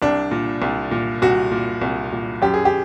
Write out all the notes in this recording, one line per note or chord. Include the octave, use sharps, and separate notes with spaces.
C2 D4
A#2
C2
A#2
C2 F#4
A#2
C2
A#2
F#2 G4
G#4
G4